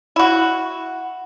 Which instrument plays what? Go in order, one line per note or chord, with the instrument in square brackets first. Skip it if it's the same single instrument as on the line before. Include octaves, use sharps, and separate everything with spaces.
[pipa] E4 F#4